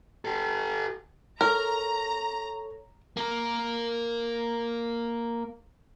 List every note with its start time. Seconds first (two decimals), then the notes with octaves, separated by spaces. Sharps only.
0.25 G4 A4
1.41 A4 A#4 C#5 A#5
3.17 A#3 A#4